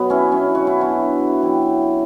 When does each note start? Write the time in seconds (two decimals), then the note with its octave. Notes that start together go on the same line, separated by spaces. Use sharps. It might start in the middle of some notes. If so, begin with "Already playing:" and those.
Already playing: B2 F#3 B3
0.10 C#4 E4
0.32 C#4 E4
0.55 F#4
0.67 E4
0.80 D4 F#4
1.32 F#4
1.42 C#3 F#3 E4 G4